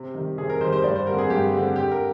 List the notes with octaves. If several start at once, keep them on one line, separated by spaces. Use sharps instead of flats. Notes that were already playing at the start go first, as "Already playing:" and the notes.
Already playing: C3
D#3 G3
C3 G#4
A#4
D#3 G3 C5
C5
G2 D5
C5
D3 G3 C4 A#4
G#4
G2 G4
D3 G3 C4
D3 G4
A#4